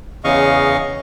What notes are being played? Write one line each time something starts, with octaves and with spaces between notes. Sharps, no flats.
E2 C#3 D#5 F5 C#6